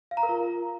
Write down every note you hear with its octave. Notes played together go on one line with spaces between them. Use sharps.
F5
A#5
A#4
F4